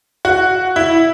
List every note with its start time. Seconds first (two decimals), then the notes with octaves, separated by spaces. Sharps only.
0.25 F#4
0.76 E4